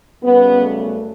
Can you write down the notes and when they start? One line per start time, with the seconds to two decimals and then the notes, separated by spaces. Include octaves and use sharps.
0.22 F#2 C#3 G3 B3
0.61 A3